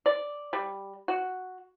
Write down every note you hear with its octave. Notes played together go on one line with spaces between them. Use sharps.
D5
G3
F#4